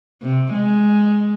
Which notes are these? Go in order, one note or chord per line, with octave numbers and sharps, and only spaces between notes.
C3
G#3